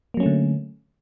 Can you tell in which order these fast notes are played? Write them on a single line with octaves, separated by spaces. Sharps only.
A#3 F#3 C#4 A3 D3